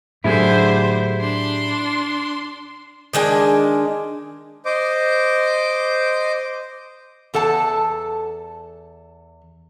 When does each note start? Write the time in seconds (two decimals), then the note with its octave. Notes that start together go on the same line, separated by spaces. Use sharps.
0.24 A2 D3 F#3 A3 E4 G4 G#4 C5
1.20 D4 C6
3.13 D#3 G#3 D4 G#5
4.65 C5 D#5 D6
7.34 E2 A4 F#5 A5